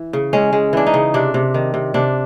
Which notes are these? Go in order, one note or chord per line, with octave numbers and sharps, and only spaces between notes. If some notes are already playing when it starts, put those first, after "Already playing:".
Already playing: E3
C#3
G#3 C#4
G#3
E3 D4
D#4
C#3
C3 D4
C3
D#3
C3
C3 D4